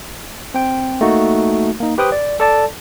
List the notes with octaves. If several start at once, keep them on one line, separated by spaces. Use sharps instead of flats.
C4 G5
A3 A#3 D#4 F#4
A#3 D#4
G4 B4 C5 G5 D#6 F#6
D5
A4 D5 A5